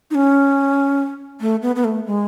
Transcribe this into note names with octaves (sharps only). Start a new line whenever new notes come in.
D#4
C#4
A3
B3
B3
A3
G#3